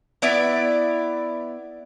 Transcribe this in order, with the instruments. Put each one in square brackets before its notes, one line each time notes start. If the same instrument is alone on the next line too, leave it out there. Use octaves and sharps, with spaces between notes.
[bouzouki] B3 E4 D5 E5